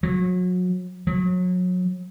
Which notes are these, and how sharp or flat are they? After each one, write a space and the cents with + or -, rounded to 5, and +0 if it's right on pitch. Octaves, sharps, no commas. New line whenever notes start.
F#3 -30
F#3 -30